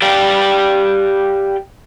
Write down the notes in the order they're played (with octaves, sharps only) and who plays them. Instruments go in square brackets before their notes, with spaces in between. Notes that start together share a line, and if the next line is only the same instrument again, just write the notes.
[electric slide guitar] G4 D5 F5 G5